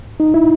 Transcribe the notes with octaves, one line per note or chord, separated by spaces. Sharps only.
D#4
E4